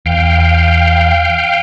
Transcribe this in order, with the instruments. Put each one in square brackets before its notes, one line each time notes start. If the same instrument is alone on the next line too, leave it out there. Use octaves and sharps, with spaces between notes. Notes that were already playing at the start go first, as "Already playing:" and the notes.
[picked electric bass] E2 [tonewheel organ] F5 G5